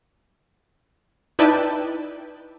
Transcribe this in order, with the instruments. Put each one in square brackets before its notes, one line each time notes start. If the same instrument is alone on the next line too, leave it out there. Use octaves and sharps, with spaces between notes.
[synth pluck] D#4 E4 B4 D5 G5 A5